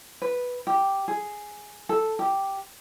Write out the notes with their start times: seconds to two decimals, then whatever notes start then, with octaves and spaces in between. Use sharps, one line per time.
0.22 B4
0.67 G4
1.08 G#4
1.89 A4
2.19 G4